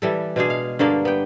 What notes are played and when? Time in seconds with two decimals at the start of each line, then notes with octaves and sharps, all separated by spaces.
0.02 E3 G3 A4
0.36 B2 G#3 D4 G#4
0.50 F5
0.79 G2 D3 A#3 D4
1.05 B3 G5